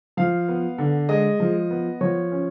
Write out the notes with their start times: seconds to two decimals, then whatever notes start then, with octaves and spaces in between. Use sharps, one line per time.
0.17 F3 F5
0.48 B3
0.78 D3
1.09 G#3 D#5
1.40 F3
1.70 B3
2.01 F3 C#5
2.31 C#4